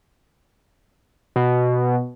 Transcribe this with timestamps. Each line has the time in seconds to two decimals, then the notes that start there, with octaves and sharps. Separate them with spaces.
1.36 B2